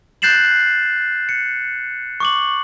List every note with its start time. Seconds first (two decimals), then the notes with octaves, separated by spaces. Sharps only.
0.22 F#6 G6 A6 C7 E7 F#7
1.29 C#7
2.20 C#6 D6 F#7